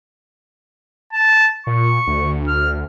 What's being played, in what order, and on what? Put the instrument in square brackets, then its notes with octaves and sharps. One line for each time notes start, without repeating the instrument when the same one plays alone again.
[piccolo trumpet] A5
[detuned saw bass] A#2 [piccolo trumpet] C#6
[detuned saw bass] D2
[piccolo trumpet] F6